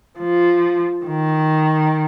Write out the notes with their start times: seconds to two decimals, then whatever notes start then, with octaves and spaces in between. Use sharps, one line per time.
0.20 F3
1.07 D#3